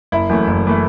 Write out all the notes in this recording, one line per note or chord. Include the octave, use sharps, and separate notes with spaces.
F#1 E4
F#2 E3 A3
F#1
E3 A3